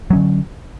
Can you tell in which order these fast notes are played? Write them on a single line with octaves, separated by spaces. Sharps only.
F#3 C#4 D3